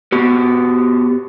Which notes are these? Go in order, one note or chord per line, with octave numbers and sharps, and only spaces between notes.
B3 F#4 G4